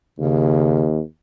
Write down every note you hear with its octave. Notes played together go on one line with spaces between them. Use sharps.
D#2 C#3